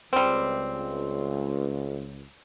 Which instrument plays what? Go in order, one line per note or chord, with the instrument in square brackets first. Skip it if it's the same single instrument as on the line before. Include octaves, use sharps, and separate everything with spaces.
[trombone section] C#2 [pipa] G3 C4